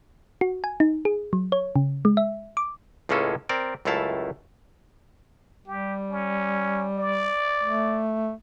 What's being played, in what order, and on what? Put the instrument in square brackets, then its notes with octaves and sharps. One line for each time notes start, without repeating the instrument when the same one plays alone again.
[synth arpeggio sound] F#4
G#5
D#4
G#4
F#3
C#5
C#3
G#3
E5
D6
[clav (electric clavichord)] C#2 A2 G#3 A#3 C#4 A4
C4 A#4 D5
C#2 F#2 A3 E4 F5 A5
[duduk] G3 [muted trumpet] G4
[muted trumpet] C#4
D5
[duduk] A3